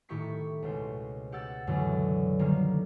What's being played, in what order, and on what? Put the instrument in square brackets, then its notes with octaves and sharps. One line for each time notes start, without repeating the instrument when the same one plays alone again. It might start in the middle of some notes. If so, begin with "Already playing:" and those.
[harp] A2 D#3 E4 G4 C#6 B6
C#2 B2 C5
G4 F#5 E6 A6
C#2 F#2 B2 D3 E3
D3 D#3 G3 A#3